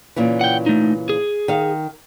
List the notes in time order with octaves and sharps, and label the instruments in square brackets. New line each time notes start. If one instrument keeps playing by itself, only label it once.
[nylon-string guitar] A#2 C#3 E3
[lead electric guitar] F#5 G5
A3 D#4
G#4
[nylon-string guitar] D#3 F5